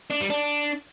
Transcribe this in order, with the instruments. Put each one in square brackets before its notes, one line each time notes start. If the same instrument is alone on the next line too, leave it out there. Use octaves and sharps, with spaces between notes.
[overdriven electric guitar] D4
G3
D4